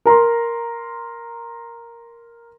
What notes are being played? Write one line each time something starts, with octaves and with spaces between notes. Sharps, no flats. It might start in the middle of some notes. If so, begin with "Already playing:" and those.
A#4 A#5 C6